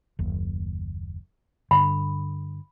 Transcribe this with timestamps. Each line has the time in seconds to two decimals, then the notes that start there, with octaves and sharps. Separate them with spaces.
0.19 F#1 D#2
1.71 G2 D3 B5